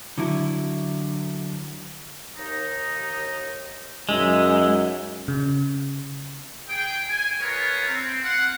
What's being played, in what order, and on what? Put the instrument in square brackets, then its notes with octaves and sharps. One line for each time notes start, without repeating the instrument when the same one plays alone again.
[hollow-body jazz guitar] D3 F#3 E4
[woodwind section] D#2 D#4
[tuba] F#2 [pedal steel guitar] G#3 [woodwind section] D#4 E5
[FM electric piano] C#3
[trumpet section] G#4 G5
G#5
F4 G#4 A#4 B4 C#5
C4
F5 F#5